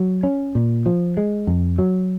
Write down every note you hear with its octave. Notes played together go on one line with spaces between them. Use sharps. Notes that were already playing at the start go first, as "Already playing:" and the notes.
Already playing: F#3
C#4
A#2
F3
G#3
F2
F#3